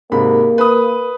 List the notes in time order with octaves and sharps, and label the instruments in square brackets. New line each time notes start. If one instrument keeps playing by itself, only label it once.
[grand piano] G#2 C3 B5 [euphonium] A#3
[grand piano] B4 B5 D#6